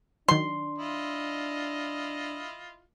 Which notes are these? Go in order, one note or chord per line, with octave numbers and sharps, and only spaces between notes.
D#3 F#3 D4 C6
E4 F4 D#5